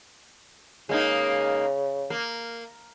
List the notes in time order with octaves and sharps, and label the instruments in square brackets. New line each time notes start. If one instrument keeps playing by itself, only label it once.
[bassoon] C#3 [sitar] G#3 A#3 D#4
[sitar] A#3